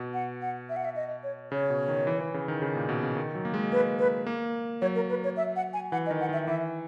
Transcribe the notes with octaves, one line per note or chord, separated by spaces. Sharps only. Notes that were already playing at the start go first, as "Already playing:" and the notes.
Already playing: B2
F#5
F#5
E5
F#5
E5
D#5
C#5
C#3 C#5
B2
D#3
E3
E3
C#3
D#3
C#3
A#2
B2
C#3
D#3
F#3
A#3
G#3
A#3 B4
B4
A#3
F#3 C#5
A#4
B4
C#5
E5
F#5
G#5
E3 F#5
D#5
D#3
F#5
D#3 E5
E3 E5